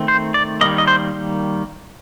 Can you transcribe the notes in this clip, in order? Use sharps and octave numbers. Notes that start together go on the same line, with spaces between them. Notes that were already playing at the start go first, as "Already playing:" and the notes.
Already playing: D#3 A3 C4
C5
D5
D#3 G3 A#3 D#5
D#5
C5